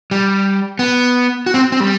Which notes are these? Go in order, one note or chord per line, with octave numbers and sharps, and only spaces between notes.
G3
B3
F#4
C4
C4
G3